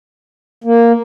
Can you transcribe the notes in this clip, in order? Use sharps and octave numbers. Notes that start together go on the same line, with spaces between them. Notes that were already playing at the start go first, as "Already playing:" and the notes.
A#3